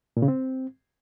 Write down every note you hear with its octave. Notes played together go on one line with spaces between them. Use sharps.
A#2
C#3
C4